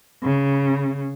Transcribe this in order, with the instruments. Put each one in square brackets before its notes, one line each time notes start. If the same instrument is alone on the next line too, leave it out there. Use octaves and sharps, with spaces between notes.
[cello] C#3